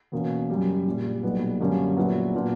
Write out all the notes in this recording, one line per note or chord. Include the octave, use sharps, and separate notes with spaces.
E2 B2 A#3 C#4
F#2 C#3 G3
A#1 A#2 G3
B1 A#2 G3 B3
F#2 D3 G3 A#3 C#4
A#1 A#2 F#3 B3 E4
A#2 F#3 B3 D4 F#4